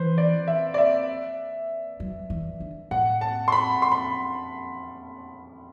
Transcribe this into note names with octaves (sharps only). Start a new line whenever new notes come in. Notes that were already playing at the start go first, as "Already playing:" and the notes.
Already playing: E3 B4 C5
D5
E5
D5
E5
F#3
E3
D3
A2 F#5
A5
C6
B5
C6
B5